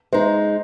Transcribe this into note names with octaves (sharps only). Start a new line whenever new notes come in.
G#3 D#4 G#4 C5